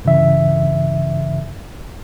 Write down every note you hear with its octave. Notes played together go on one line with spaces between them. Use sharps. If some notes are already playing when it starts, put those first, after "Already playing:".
G2 C#3 E3 E5